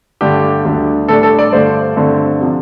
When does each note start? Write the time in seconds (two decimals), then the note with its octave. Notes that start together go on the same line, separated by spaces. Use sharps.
0.21 G2 D3 A3 D4 G4
0.65 D2 D3 G3 D4
1.08 A2 G3 D4 A4
1.23 A4
1.39 D5
1.52 G2 D3 A3 D4 C5
1.96 G2 D3 A3 C4
2.40 C3 F3 D4